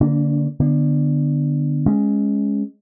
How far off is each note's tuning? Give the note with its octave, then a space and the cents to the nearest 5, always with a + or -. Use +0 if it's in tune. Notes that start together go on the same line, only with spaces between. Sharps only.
D3 +0 A#3 +0 D4 -35
D3 +15 B3 +0
G#3 +0 C#4 +0